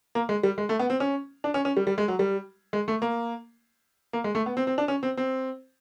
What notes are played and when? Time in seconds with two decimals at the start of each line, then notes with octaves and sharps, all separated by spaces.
0.15 A#3
0.29 G#3
0.43 G3
0.58 G#3
0.69 A3
0.79 B3
0.90 C4
1.00 C#4
1.44 D4
1.54 C#4
1.65 C#4
1.76 G3
1.87 G3
1.98 G#3
2.08 F#3
2.19 G3
2.73 G#3
2.88 A3
3.02 A#3
4.13 A#3
4.24 G#3
4.35 A3
4.46 B3
4.57 C4
4.67 C4
4.78 D4
4.88 C#4
5.03 C4
5.17 C4